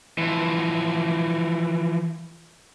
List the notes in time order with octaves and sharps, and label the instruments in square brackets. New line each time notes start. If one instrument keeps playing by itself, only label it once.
[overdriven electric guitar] E3 F3